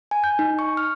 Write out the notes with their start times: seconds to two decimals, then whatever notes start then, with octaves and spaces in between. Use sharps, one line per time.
0.11 G#5
0.24 G6
0.39 D#4
0.59 C#6
0.77 F6